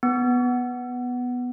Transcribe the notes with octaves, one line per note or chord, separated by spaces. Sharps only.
B3